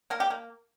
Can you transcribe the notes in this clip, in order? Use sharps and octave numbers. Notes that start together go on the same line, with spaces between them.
A#3 A#4
G4
A#3